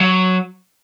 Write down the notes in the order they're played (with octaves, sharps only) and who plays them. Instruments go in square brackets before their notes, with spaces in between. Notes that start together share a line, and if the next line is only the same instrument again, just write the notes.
[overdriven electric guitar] F#3